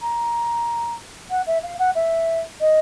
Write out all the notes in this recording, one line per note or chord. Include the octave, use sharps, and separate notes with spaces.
A#5
F#5
E5
F5
F#5
E5
D#5